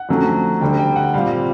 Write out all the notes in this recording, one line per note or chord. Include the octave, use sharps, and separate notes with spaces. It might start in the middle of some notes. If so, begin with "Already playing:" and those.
Already playing: F#5
F2 D3 F#3 A3 C#4
D2 D3 G3 G5
G5
F#5
A#2 G3 C4 F5